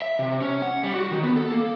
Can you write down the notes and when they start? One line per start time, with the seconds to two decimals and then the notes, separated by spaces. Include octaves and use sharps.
0.02 E5
0.19 C3
0.41 C#4
0.62 F#5
0.83 G3
0.95 F#4
1.12 D#3
1.23 B3
1.36 A4
1.52 A#3